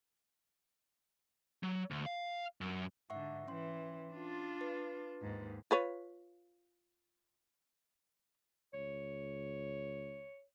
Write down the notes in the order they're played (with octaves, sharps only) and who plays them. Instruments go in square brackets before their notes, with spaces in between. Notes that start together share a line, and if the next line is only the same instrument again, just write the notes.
[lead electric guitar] F#3
D2
F5
F#2
[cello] G#2 D3 [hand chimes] E5 F#5 C#6
[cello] E3 [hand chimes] C#4 C6
[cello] D4 F4
[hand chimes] B4
[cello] D#2 G#2
[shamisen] F4 B4 C#5
[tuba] C#2 [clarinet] C#5